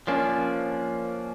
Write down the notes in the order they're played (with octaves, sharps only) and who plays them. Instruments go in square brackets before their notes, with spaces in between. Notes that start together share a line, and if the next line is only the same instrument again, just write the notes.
[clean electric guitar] F3 A#3 D4 [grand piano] C#4